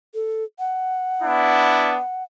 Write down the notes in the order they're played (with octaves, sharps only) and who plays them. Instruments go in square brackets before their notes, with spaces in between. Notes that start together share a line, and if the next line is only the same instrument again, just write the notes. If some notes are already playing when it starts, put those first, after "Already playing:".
[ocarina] A4
F#5
[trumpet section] B3 D4 E4